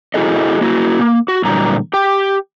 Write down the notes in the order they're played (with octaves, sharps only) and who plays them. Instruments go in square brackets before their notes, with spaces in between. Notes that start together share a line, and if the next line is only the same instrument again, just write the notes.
[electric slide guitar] E4 F#4 G#4 A4 D#5
A#3 E4 F#4
A#3
F#4
A#2 D3 E3 F#3 G3 A#5
G4 G5